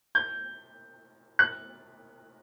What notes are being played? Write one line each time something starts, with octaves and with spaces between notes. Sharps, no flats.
G6
F#6